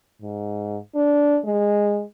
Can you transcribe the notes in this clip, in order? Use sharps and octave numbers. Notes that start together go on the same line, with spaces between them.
G#2
D4
G#3